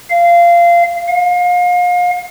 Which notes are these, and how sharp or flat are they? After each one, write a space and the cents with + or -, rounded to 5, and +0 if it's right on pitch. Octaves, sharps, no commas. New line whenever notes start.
F5 -20
F5 +35